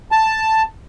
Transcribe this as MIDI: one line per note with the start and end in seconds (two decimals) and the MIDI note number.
0.12 0.63 81